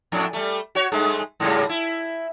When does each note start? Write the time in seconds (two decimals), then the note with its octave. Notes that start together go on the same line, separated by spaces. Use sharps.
0.12 F2 A2 D4
0.33 G3 A3
0.75 F#4 C#5
0.92 G2 G#3 A3
1.40 G#2 C#3 G3
1.69 E4